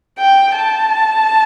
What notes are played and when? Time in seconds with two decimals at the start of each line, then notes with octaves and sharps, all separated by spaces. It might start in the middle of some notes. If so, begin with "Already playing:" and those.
0.19 G5
0.56 A5